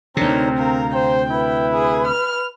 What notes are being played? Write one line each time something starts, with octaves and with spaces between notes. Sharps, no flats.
D2 C3 C4 D4 D#4 A#4 C#5
A#4 F5 A#5
C5 G5
E4 B4 B5
G#4
F6